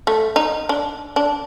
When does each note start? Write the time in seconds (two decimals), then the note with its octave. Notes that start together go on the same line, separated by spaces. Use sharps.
0.07 A3
0.36 D#4
0.69 D4
1.16 D4